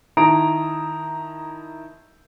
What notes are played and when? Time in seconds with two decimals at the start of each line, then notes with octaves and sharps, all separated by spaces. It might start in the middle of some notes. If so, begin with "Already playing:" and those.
0.17 D#3 E4 A5 A#5 D#6 D7